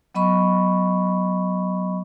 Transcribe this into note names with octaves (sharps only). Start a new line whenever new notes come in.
F#3 B3 D#5 B5 C#6